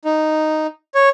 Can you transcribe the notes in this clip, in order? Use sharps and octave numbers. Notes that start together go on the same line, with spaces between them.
D#4
C#5